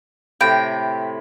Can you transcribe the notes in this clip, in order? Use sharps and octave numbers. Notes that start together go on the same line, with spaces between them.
A2 C3 G5 B5